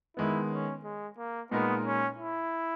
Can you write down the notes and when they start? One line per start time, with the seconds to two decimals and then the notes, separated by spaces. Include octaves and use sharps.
0.17 D#3 G#3 B3 E4
0.50 C#4
0.84 G#3
1.18 A#3
1.51 A#2 G#3 B3 D#4 A#4
1.85 C#4
2.18 E4